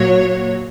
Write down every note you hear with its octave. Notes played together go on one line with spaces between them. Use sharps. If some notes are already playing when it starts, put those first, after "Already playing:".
Already playing: A#2 F#3 C#5